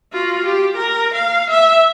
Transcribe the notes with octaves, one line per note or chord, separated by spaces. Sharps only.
F4 F#4
G4
A#4
F5
E5